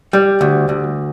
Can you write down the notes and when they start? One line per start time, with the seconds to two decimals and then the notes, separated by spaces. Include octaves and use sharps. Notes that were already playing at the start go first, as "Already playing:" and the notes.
0.13 G3
0.41 D2
0.69 D2